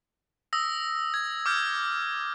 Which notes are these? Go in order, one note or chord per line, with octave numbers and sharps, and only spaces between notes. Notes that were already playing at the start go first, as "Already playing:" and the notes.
D#6 E6 A#6
G#6
D6 F6 G6